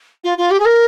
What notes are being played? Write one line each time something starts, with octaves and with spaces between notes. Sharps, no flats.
F4
F4
G4
G#4
A#4